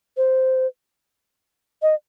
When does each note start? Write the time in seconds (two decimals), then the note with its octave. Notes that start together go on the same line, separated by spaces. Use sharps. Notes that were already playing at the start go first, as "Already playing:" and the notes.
0.17 C5
1.82 D#5